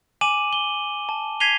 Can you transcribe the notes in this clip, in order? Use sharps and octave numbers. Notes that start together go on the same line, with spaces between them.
G#5 D6 D#7 E7 F#7
G7
A5
G#6 B6 C7 D#7 F7 G7